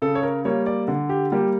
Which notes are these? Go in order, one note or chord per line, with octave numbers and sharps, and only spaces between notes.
C#3 A4
C#5
A#4
G3 A#3 C#5
D5
D3
G4
G3 A#3 G4